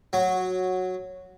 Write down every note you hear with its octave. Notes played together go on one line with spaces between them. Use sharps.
F#3